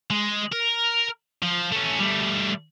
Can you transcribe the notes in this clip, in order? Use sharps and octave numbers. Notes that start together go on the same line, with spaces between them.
G#3
A#4
F3
A3 C#4
G3 A3